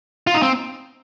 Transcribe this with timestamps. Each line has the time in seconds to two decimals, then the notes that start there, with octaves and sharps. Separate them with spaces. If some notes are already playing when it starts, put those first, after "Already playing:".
0.27 F4
0.34 D#4
0.42 C4